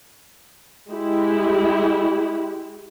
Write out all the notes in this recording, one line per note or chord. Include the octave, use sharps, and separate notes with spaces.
G#3 E4 G4